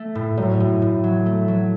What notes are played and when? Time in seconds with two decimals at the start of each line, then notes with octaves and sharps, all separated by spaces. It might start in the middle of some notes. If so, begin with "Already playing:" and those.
Already playing: A3
0.15 A2
0.37 A2 F#3
0.60 A2
0.82 A2
1.04 F#3
1.26 A3
1.48 F#3